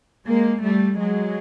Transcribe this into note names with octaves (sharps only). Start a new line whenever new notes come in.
G#3 A#3
G3 A3
F#3 G#3